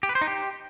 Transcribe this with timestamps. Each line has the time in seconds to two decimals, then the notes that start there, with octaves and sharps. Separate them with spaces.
0.03 G4
0.09 B4
0.15 C5
0.21 D#4
0.27 G4